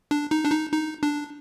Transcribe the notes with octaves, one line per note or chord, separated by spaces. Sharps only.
D4
D#4
D4
D#4
D#4
D4